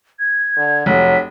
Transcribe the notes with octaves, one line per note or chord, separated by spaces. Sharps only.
G#6
D3
F1 F#3 B6